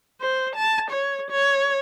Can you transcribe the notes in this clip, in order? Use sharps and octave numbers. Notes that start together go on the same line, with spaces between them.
C5
A5
C#5
C#5